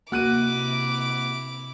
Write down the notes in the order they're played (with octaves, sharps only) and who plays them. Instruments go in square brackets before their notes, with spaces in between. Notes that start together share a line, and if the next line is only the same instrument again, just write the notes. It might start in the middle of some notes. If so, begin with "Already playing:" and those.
[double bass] C3 [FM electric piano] A#3 [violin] E4 D6 [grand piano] F#4 F#6 D#7